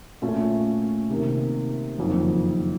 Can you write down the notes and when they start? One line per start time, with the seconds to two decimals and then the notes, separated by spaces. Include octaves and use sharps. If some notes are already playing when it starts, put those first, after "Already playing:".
0.22 A#2 A3 C#4 F4
1.10 C3 D#3 A#3
1.98 F#1 F2 D#3